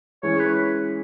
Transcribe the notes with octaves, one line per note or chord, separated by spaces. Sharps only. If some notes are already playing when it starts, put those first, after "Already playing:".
E3 G#3 C#4 G#4 C#5
B4